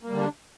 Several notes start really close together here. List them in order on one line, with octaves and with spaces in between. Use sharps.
A#3 G3 D3 D4